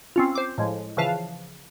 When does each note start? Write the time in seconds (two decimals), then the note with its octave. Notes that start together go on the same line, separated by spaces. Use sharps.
0.16 C4 C#4 F4
0.35 C5 D6
0.58 A2 F3 G#3
0.97 C#3 E3 F3 B4 F5 A5